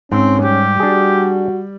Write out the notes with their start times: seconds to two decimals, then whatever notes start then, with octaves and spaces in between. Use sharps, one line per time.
0.12 G#2 C4 C#4
0.43 G3 G4
0.80 D4 F#4 G#4